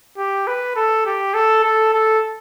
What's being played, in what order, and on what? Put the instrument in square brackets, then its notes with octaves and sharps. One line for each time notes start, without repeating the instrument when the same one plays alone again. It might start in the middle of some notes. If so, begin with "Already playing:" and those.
[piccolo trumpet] G4
B4
A4
G4
A4
A4
A4